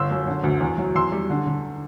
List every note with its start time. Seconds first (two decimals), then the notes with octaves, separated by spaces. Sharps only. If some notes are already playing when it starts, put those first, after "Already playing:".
Already playing: G1 C6 E6
0.11 F#2
0.27 D3
0.44 D2
0.61 E2
0.78 F#3
0.95 E2 C6 E6
1.12 G3
1.30 D3
1.47 D3